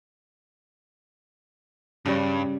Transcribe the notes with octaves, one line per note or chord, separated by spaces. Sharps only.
G2 C#3 G3